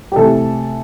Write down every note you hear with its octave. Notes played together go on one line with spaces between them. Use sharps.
G4
C3 E3 A3 A4